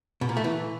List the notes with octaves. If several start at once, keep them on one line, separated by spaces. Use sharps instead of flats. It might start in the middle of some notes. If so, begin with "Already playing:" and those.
B2
A#2
A3
E3